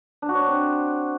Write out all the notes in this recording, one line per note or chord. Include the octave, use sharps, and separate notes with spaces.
D4
F#4
C#5
D4
C4